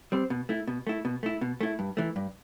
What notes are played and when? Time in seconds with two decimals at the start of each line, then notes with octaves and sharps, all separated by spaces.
0.12 G3 C4
0.30 B2
0.49 A3 E4
0.67 B2
0.87 A3 E4
1.05 B2
1.23 A3 E4
1.41 B2
1.61 A3 E4
1.79 G2
1.97 E3 A3
2.16 G2